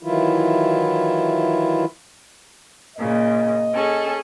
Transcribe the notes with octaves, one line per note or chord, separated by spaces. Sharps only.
D#3 E3 F#3 E4 F4
A#2 C#3 D#5
C#4 G#4 A4